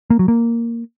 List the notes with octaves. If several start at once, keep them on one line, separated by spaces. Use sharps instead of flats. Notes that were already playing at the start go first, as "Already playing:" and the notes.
A#3
F#3
A#3